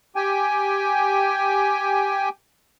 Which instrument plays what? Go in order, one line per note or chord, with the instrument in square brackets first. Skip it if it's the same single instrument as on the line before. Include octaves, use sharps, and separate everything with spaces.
[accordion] G4 G5 G#5